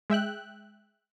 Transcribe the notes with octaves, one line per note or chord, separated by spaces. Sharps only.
G#3 E5 G5 F#6